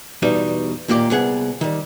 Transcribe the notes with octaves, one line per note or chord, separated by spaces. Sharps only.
E2 B2 G3 D#4
D#2 A#2 A#3 G4 D5
C2 B3 G#4 F#5
D#3 G3